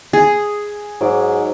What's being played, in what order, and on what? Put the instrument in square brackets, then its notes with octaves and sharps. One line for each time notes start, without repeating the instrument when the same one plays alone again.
[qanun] G#4
[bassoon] G#2 [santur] F#3 D6